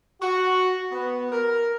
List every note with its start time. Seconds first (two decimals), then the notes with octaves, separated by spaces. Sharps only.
0.22 F#4
0.92 B3
1.32 A#4